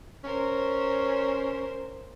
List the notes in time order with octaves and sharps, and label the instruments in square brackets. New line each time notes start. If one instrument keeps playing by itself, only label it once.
[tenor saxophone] C#4 [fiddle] A#4 C5